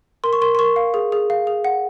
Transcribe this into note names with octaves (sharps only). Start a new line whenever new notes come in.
A#4 C6
C#6
A#4 C6
C6
A#4 C#6
F5
G#4
G#4
F5
G#4
F#5